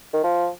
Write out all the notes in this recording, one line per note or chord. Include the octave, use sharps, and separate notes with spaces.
D#3
F3